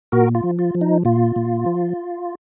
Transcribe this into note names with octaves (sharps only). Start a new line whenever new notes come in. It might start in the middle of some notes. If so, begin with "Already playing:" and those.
A#2 F#4 A#4
F4
F3
F4
F3
D#4
A#2 F4
A#2
F3